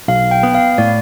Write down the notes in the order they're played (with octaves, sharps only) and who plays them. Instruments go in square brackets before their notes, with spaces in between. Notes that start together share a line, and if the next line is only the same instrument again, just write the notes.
[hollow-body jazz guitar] B1 [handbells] F5
[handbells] G5
[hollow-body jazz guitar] B3
[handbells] F5
[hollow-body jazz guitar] A2 [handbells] D5